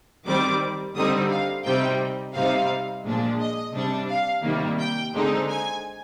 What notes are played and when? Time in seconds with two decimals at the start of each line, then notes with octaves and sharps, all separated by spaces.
0.26 D#3 G3 C4 D6
0.96 D3 G3 C4 D#4 D#6
1.31 F5
1.65 C3 G3 C4 D#4 G5
2.34 C3 G3 C4 D#4 F5
3.05 A#2 F3 G#3 D4
3.40 D#5
3.74 C3 G3 D4
4.09 F5
4.44 C3 D#3 G3 A#3
4.80 G5
5.14 D3 G#3 C4 D#4
5.49 G#5